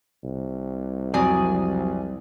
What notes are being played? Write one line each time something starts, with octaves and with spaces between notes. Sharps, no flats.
C2
F2 F#3 C4 D5 G#5 D#6